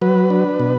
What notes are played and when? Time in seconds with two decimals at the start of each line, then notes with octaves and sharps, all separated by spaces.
0.01 F#3 B4
0.30 D4
0.60 B2